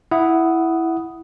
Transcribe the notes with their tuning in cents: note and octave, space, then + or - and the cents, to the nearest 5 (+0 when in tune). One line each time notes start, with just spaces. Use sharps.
E4 +0 F#5 +0 D#6 +0